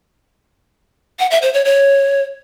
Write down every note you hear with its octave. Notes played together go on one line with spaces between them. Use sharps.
F#5
E5
C5
C#5
C#5